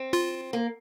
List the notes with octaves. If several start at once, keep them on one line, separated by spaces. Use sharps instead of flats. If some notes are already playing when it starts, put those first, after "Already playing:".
Already playing: C4
F4
A#3